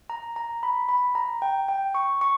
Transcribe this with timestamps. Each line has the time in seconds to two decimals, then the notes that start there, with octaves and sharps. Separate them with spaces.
0.10 A#5
0.36 A#5
0.63 B5
0.89 B5
1.15 A#5
1.42 G5
1.69 G5
1.95 C#6
2.21 C#6